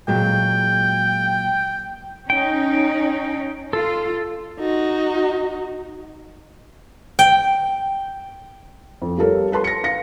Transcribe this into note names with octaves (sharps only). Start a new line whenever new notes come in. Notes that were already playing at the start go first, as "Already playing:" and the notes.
A#2 F#3 G#3 G5
C#4 D#4 G5
F4 A4
D#4 F#4
G5
F2
G3 F4 A4 A#4 C#5
A4 B4 A5 C6
A#6 C#7
F5 A#6 C#7